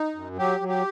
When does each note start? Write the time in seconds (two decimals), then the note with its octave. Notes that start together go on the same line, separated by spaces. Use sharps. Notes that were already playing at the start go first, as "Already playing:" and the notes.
Already playing: D#4
0.15 F#2
0.37 F#3 G4
0.60 F#3
0.68 G4